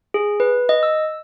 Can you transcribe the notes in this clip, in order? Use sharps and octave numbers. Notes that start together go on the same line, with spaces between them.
G#4
B4
D#5
E6